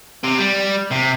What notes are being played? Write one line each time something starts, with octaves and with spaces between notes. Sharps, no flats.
C3
G3
C3